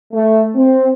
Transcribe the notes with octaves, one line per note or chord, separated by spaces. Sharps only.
A3
C4